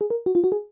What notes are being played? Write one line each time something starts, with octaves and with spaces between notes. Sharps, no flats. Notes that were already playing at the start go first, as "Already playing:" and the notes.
G#4
A#4
F#4
F4
F#4
G#4